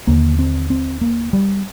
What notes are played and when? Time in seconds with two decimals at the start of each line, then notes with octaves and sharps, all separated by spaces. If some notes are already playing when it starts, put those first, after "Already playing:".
0.07 D#2 D3 A#3
0.39 C4
0.70 C4
1.01 A#3
1.33 G3